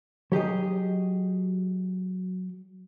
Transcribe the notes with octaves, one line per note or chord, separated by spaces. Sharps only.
F#3 G4 G#4 D#5